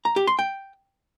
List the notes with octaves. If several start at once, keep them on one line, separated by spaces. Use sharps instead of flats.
A#5
G4
C6
G5